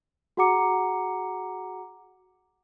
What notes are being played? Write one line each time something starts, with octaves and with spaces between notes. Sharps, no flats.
F#4 G#4 F#5 A#5 D6 C#7